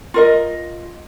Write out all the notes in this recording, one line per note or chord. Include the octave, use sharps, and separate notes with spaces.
F4 A#4 D#5